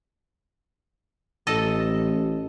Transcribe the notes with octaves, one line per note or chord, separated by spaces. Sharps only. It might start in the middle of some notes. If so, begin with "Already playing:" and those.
A1 A4 D#5